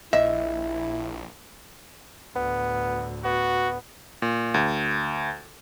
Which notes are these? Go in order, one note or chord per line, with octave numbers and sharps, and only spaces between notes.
A#1 E4 D#5 E5
D2 A2 B3
B3 F#4
A#2
D2